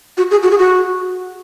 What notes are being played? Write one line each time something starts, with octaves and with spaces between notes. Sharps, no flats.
F#4
G#4
F#4
G#4
F#4